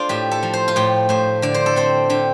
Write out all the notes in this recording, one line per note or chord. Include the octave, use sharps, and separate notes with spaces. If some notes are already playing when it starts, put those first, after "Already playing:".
Already playing: D4 F4 A4 C5 D5
A2 G4
A4
F3
C5
F4
A2 G4
A2 C5
D3 D5
C5
A4
C4 C5
D3 G4